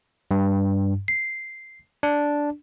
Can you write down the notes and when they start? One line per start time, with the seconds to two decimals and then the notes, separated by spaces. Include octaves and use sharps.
0.31 G2
1.08 C7
2.03 D4